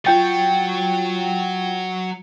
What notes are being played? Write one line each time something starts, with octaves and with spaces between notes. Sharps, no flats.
F#3 F4 C#5 G5 A6